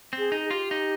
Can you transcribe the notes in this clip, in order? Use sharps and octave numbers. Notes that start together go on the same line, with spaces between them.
C4
G#4
D#4
G#4
F4 G4
D#4